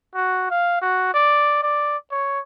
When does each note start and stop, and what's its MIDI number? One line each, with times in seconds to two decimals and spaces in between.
0.15 0.47 66
0.51 0.77 77
0.82 1.09 66
1.14 1.61 74
1.63 1.97 74
2.11 2.40 73